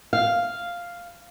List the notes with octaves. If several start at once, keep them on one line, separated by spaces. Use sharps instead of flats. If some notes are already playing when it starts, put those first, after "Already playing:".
F5